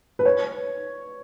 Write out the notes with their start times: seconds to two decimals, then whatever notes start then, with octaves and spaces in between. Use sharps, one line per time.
0.19 B4
0.25 C#5